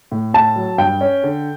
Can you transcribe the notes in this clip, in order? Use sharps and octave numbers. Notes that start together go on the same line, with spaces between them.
A2
A2 A5
F#3
G2 G5
C#4
D3